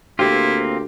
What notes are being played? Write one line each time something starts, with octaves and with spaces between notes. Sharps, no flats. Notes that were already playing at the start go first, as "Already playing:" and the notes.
D2 A#3 C4 E4 F4 G4